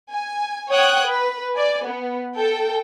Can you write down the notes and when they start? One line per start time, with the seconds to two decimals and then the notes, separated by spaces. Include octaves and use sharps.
0.11 G#5
0.69 C#5 F#5 G5 D#6 F#6 G#6
1.06 B4
1.54 D5 G#5
1.85 B3
2.36 A4 G5